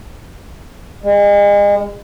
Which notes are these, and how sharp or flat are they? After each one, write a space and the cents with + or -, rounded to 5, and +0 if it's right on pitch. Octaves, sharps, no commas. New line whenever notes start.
G#3 -35